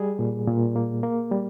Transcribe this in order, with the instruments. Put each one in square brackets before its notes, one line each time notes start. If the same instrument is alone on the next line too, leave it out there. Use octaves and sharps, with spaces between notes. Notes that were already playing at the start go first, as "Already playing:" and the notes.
Already playing: [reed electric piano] G3 G#4
A#2
A#2
A#3
A#3
G3